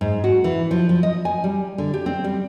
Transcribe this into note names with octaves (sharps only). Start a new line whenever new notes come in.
G#2
F#4
E3
F3
F3
D#5
G#5
G3
D3
G4
C4
G3